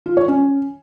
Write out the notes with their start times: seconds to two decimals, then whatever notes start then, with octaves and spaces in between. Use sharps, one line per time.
0.06 F4
0.17 C#5
0.28 C#4